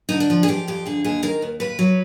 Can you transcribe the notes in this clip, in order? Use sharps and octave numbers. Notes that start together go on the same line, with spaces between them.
D3 D#4
D4
F3
G#4
F3 G4
F2 G4
D3 G#4
D#2 G#4
D#3 A#4
D#2
D#2 B4
F#3